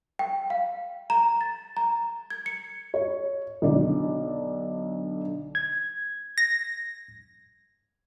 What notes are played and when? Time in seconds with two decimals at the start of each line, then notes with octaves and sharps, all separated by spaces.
0.19 G5
0.50 F5
1.10 A#5
1.41 A6
1.77 A#5
2.30 G#6
2.46 C#7
2.94 C#5
3.62 B1 D3 D5
5.55 G#6
6.38 A#6